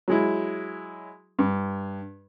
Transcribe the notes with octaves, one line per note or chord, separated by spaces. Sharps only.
F#3 G#3 E4
G2